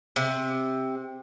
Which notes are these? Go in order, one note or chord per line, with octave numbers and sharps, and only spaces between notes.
C3